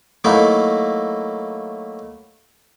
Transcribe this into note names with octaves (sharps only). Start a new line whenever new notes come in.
F#3 A3 A#3 D#4 E4